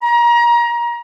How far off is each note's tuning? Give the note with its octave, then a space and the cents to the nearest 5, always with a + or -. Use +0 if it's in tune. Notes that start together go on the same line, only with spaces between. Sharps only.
A#5 +30